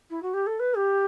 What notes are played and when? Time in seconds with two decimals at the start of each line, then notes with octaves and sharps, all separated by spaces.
0.10 E4
0.23 F#4
0.34 G4
0.47 A4
0.60 B4
0.76 G4